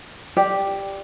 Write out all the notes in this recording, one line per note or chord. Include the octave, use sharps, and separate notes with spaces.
G4 D5